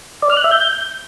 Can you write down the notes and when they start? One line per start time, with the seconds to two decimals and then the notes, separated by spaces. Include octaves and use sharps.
0.22 D5
0.30 F6
0.37 F#6
0.44 E5
0.51 G6